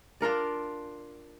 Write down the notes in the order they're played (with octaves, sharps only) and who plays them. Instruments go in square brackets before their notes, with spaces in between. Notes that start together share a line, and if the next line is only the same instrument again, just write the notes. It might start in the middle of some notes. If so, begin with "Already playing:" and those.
[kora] D4 F4 A#4 D5